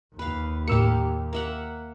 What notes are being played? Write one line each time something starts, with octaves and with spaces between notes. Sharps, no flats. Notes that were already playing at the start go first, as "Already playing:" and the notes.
D#2 B4 F5
A2 A#3 G4 E6 C#7
A#3 E5 F#5